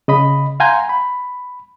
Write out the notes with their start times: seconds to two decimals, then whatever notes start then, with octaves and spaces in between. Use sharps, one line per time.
0.08 C#3 D#5 B5
0.60 F5 F#5 G#5 A#5 C6 G6
0.89 B5